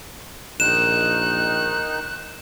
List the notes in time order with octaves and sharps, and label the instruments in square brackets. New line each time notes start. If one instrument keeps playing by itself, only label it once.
[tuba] A#1 [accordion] D#3 D#4 [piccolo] F#6 [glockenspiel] E7